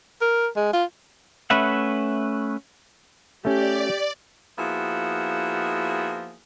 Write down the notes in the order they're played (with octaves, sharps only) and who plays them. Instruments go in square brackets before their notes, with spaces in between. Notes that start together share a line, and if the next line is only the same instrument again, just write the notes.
[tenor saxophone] A#4
G#3
F4
[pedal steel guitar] A3 C#4 B4 E5 F#5
[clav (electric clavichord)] A3 C#4 [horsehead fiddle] G4 [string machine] D5
[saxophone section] F3 A#3 B3 E4 F#4 G#4